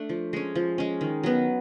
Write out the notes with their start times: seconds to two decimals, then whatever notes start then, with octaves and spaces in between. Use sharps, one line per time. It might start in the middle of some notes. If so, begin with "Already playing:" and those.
Already playing: A3 D4
0.09 F3
0.33 G#3 C#4
0.55 F3
0.78 G#3 C#4
1.01 D#3
1.23 F#3 B3